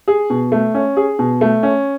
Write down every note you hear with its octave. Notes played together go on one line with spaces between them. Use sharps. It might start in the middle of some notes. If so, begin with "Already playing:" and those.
G#4
B2
A3
C#4
G#4
B2
A3
C#4